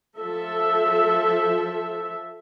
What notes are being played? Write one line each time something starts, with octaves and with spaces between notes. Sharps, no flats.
F3 A4 E5